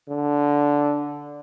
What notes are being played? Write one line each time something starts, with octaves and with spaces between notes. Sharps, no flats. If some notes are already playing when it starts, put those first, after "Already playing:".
D3